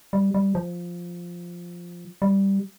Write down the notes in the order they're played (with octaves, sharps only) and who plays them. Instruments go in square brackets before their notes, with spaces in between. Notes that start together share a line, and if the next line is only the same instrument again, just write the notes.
[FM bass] G3
G3
F3
G3